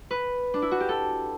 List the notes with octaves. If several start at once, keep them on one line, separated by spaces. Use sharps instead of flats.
B4
D4
E4
F#4
G4
A4